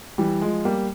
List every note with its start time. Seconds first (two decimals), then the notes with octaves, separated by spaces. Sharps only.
0.18 E3 G3
0.41 F3 G#3
0.65 G3 A#3